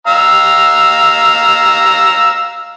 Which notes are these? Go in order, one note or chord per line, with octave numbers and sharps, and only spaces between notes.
F5 A#5 E6